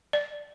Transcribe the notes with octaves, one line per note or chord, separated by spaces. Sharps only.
D5